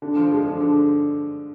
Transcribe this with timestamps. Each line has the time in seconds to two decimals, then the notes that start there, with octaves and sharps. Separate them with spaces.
0.02 D3
0.16 F3
0.32 G#3
0.45 D3
0.60 D3